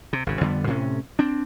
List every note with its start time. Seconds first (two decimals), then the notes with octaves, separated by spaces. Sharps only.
0.13 C3
0.27 G#1 C#3
0.41 F2 D3 G3 B3
0.67 A2 C3 C#4
1.19 C4 D4